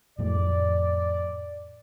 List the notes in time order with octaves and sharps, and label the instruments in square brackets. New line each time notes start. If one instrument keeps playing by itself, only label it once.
[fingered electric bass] F2 A2 A3 [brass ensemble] D5